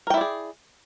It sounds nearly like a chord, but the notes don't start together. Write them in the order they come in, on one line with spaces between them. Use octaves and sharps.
A#4 G5 E4 D5 G#4